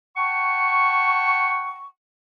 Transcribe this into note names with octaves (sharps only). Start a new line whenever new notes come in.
F#5 G5 A5 C#6